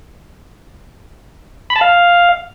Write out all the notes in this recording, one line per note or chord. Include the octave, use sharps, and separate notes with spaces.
B5
A5
F5